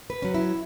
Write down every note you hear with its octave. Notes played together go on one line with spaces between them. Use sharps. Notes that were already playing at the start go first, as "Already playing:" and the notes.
B4
F#3 C#4
E4